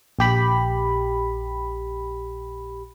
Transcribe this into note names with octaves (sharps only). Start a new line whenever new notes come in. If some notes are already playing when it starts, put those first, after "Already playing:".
A#1 G4 B5